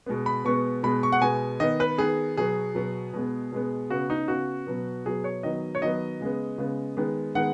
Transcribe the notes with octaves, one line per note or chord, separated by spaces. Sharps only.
B2 G#3 B3
B5
B2 G#3 B3 C#6
B2 G#3 B3 B5
C#6
F#5
B2 G#3 B3 G#5
D#3 B3 D#5
B4
D#3 B3 G#4
B2 F#3 B3 G#4
B2 F#3 B3
B2 G#3 B3
B2 G#3 B3
C#3 B3 F#4
D#4
C#3 B3 F#4
B2 F#3 B3
B2 F#3 B3 G#4
C#5
D#3 F#3 B3 D#5
C#5
D#3 F#3 B3 D#5
C#3 G#3 B3
C#3 G#3 B3
D#3 G#3 B3
D#3 G#3 B3 F#5